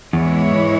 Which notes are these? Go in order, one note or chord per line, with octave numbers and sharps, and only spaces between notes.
E2 G#2 E3 G#3 E4 C#5